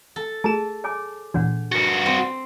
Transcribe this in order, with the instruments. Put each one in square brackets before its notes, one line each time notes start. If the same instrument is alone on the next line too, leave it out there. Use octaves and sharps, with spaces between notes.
[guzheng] A4
[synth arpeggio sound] A3 E7 [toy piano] G#4 A5
[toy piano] C#5 G#5 D6
[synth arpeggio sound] A#2 E3 [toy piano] D4 C#5 F#5
[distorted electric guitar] G2 F#4
[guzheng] C4